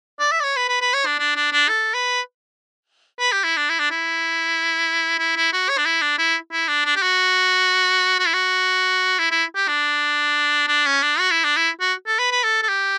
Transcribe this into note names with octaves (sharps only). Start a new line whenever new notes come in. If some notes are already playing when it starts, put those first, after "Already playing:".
D5
E5
D5
C#5
B4
B4
B4
C#5
D4
D4
D4
D4
A4
B4
B4
G4
E4
D4
E4
D4
E4
E4
E4
F#4
C#5
D4
E4
D4
E4
E4
D4
D4
G4
F#4
F#4
E4
F#4
E4
E4
G4
D4
D4
C#4
D4
F#4
E4
D4
E4
F#4
A4
B4
B4
A4
A4
G4